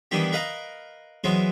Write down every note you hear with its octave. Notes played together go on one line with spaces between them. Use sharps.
D#3 E3 G3 B3 D4 G4
A#4 B4 D#5 F5 A#5
E3 F#3 G#3 B3 C4